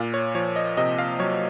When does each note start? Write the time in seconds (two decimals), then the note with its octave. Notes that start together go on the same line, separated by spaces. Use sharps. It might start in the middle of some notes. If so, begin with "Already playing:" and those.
Already playing: A#2 F5
0.14 C#5
0.35 F3 C#5
0.56 D#5
0.77 C3 D#5
0.98 F5
1.19 F#3 C#5